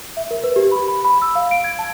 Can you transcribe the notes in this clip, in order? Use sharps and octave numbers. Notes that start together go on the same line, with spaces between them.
E5
A#4
B4
G4
B5
B5
B5
E6
F5
D7
G#6
A5